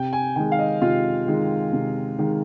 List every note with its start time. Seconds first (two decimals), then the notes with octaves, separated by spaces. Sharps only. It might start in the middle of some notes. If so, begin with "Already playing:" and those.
Already playing: C3 G5
0.13 G#5
0.36 D#3 G#3 G5
0.52 F5
0.59 D#5
0.82 C3 F4
1.27 D#3 G#3
1.73 C3
2.19 D#3 G#3